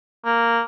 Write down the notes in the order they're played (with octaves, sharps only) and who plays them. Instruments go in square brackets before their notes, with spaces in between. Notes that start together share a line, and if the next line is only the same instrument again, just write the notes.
[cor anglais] A#3